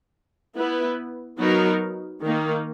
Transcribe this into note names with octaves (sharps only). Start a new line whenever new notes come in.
B3 E4 B4
F#3 B3 D#4 A#4
D#3 A#3 D#4